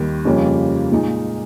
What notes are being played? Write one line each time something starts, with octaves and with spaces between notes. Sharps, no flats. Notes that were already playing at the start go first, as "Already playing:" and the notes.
Already playing: D#2 D#3 G3
F2 C#3 G3 A#3 C#4
A#2 G#3 D#4